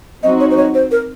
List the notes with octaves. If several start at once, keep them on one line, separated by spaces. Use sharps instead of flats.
F#3 C4 D#4 F#4 D#5
C#5
C5
C#5
C5
A#4